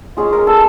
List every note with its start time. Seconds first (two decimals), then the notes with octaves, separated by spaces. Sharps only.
0.17 G#3 C#4 F4 G#4
0.33 A#4
0.47 A4